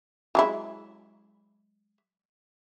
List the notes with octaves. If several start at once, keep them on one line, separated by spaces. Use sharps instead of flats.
F#3 G#3 E4